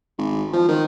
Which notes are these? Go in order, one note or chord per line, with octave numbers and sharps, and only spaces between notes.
G#1
F3
D#3